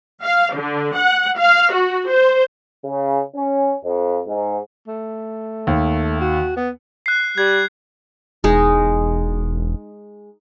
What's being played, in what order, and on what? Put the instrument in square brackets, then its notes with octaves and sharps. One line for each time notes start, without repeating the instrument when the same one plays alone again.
[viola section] F5
D3
F#5
F5
F#4
C5
[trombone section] C#3
C#4
F2
G#2
[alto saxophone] A3
[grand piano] D#2
[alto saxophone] F#4
B3
[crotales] F#6 C7
[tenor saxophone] G3 [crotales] G#6
[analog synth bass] E1 [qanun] G#3 D#4